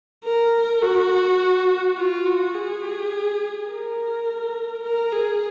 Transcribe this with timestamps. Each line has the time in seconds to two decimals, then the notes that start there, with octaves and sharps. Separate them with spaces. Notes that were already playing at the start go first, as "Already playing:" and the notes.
0.24 A#4
0.82 F#4
1.97 F4
2.25 F#4
2.54 G#4
3.68 A#4
4.84 A#4
5.12 G#4